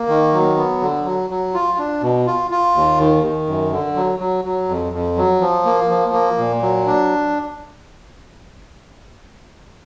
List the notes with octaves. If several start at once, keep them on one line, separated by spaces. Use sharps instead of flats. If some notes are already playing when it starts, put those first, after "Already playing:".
Already playing: A#3
D#3
F#3
B3
D3
F#3
F#3
F4
D4
B2
F4
F4
D#2
D#3
D#3
F#2
D3
F#3
F#3
F#3
F2
F2
F#3
F3
A#3
F3
A#3
A#2
F#3
D4